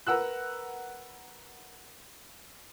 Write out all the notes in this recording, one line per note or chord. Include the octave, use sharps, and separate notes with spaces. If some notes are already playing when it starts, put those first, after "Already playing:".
A#4 B4 F#5 E6 F#6